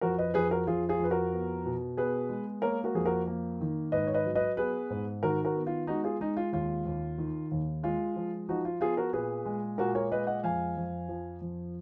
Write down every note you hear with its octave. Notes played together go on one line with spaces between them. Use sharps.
F2 F#4 A#4
B4 D#5
F2 G#4 B4
F#4 A#4
F2 F4 G#4
F4 G#4
F2 B4
F#4 A#4
B3
B2
B3 G#4 B4
G#3
A#3 A#4 C#5
F#4 A#4
F2 G#4
F#4 A#4
A#3
D#3
G#2 B4 D#5
C#5
B4 D#5
F#3
B4 D#5
B3 G#4 B4
G#2
D#3 F#4 A#4
F#4 A#4
B3
F4
G#3 D#4 F#4
F4 G#4
G#3 D#4
F4
D#2 F4
D#2
D#3
D#2
G#3 F4
F3
F3 D#4 F#4
F4
B3 F4 G#4
F#4 A#4
A#2 G#4 B4
G#3
A#2 F#4 A#4
A#4 C#5
G#3 B4 D#5
D#5 F#5
F2 F5 G#5
F2
F3
F2